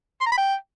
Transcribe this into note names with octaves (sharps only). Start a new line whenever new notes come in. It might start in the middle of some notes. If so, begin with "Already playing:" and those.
C6
A#5
B5
G5